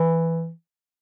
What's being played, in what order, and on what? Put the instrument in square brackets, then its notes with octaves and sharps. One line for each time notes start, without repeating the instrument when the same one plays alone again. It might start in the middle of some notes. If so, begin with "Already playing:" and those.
Already playing: [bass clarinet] E3